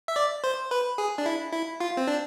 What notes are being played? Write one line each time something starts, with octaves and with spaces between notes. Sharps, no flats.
E5
D5
C5
B4
G#4
D4
E4
E4
F4
C4
D4